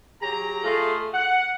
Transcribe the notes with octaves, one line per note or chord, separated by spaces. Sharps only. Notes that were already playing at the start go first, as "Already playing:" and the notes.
F#3 G4 G#4 A#5
A3 F4 G#4 A4 D#5 C6
F#5